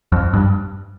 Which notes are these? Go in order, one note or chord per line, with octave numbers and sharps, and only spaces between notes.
F2
G2